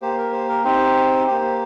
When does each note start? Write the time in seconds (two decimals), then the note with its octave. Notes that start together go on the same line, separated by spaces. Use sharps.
0.02 A#3 G4 C5
0.18 A#4
0.33 C5
0.49 A#4
0.64 C4 D#4 G4 C5
1.27 A#3 G4 C5